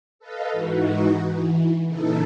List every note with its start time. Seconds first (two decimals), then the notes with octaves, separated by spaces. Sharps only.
0.19 A4 B4 D#5 F5
0.52 G#2 E3 D#4 F#4
1.24 E3
1.86 A#2 C#3 E3 D#4 A4